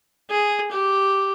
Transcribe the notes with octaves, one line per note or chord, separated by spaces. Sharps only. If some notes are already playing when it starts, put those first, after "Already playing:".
G#4
G4